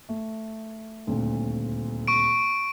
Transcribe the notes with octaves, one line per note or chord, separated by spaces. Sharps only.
A3
D#1 D2 C4
C#6 D7